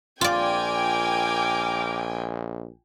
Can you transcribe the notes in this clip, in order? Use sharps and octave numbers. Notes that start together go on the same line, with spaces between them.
A#1 F4 A#4 D5 G5 G#5 D6